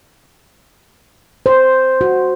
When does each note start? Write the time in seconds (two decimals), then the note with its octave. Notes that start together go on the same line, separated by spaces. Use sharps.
1.46 C5
2.01 F#4